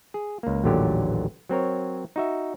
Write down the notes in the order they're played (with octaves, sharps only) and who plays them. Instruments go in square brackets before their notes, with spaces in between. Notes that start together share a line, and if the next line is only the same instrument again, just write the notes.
[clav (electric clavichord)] G#4
C#2 A#3
A1 D#2 A#2 D3 F#3 G4
F#3 C4 A#4 C#5
D#4 F#4 E5